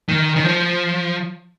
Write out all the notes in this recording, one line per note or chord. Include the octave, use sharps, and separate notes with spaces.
D#3
D#3
F3